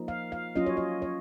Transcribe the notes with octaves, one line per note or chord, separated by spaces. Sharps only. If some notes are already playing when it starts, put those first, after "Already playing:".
Already playing: F3 A#3 D#4
F5
F5
F#3 C#4 F4 D#5
C#5
D#5
C#5